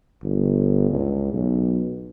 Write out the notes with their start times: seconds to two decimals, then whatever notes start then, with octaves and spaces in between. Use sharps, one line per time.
0.23 G1
0.91 C#2
1.33 B1